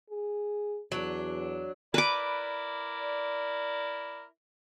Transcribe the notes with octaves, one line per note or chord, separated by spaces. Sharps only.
G#4
E2 F#3 D4
E4 A#4 B4 D5 D6